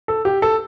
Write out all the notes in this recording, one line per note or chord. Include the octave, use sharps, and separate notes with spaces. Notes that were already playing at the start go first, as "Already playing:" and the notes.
A4
G4
A4